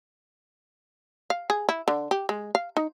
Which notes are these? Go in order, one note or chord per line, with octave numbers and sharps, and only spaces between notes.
F5
G#4
E4
D3
G4
G#3
F5
D#4